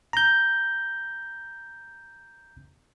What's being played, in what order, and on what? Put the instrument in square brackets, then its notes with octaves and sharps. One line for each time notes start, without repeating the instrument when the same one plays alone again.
[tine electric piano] A#5 G6